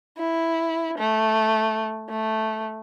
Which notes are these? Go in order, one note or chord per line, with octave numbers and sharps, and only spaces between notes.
E4
A3
A3